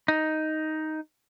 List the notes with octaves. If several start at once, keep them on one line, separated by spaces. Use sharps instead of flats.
D#4